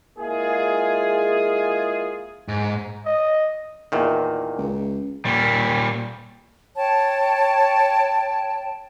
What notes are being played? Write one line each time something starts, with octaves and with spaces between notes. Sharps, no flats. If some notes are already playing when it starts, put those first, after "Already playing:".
G#3 A#3 E4 F4 G#4
G#2
D#5
E2 A#2 D#3
C#2
A#2 G3
C#5 G5 A5